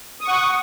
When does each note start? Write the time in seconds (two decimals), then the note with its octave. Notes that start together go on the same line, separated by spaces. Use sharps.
0.20 D#6
0.24 C#6
0.28 F#5